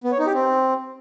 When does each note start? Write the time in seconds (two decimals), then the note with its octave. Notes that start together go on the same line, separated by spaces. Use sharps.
0.04 B3
0.11 C#5
0.19 D#4
0.26 G4
0.34 C4